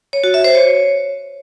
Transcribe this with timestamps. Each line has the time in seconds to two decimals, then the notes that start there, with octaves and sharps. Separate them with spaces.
0.13 C#5
0.24 F#4
0.34 E5
0.44 C5
0.55 C#5